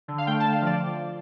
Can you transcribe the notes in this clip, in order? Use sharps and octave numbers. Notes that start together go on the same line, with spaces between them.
D3
F5
A3 G5
D3 A5
F5
F3 D5